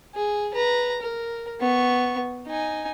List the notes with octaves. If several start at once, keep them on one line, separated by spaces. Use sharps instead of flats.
G#4
B4 A#5
A#4
B3 C#6
D#4 G#5